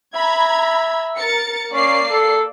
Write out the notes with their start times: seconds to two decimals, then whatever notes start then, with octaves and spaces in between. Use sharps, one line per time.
0.15 E5 A#5 B5 G#6
1.18 A#4 A6 C#7
1.73 A#3 C#4 D5 C7
2.11 A4